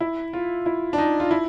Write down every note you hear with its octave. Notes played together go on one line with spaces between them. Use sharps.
E4
F4
E4
D4
D#4
F4
E4